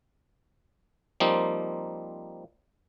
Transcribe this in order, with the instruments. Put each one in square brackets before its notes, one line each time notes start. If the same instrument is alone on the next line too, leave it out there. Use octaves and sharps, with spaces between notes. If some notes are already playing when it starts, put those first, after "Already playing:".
[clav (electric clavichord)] F3 G3 A#3 C4 D#4